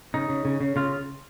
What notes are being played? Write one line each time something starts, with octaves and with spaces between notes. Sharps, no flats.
C#3 D#4
C#3
C#3
C#3
C#3 F4